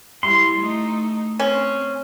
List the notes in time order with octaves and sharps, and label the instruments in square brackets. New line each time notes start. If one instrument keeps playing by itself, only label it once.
[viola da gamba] G3 E4 [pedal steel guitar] C6
[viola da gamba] A3 D#4
[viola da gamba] C4 [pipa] C#4